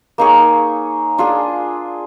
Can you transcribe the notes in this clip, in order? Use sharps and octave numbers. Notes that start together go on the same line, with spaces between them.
A#3 D#4 G#4 C#5
D4 F4 G#4